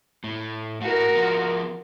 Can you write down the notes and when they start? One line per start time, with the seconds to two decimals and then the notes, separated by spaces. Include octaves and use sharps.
0.24 A2
0.81 A2 F#4 A#4
1.15 F3 B3